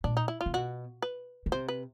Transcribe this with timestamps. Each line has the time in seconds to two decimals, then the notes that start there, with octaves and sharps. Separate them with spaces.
0.04 A#2 D4
0.17 D#4
0.28 E4
0.41 F4
0.46 C3
0.53 B2 F#4
1.02 B4
1.46 C#3
1.52 C3 C5
1.68 B4